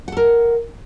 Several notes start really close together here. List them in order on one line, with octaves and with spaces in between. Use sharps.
F#5 A4 A#4